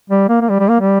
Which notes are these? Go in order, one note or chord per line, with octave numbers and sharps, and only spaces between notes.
G3
A#3
A#3
G3
G3
A#3
G3